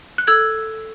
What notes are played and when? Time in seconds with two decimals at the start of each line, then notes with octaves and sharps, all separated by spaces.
0.18 F#6
0.27 A4 E6 G#6